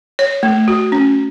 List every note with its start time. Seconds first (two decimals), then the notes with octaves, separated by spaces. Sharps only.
0.19 C#5
0.43 A3
0.68 F#4
0.92 C#4